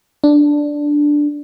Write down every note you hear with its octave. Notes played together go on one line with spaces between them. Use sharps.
D4